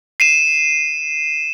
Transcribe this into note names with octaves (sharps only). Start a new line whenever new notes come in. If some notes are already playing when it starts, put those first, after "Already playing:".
C7 D#7 E7